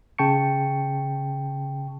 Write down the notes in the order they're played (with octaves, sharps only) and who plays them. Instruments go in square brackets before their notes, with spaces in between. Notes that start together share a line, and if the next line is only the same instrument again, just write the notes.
[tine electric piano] C#3 G5 A5 C#6 C#7